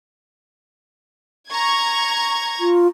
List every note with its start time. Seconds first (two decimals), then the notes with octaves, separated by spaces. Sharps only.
1.49 A#5 C#6 G#6
2.60 F4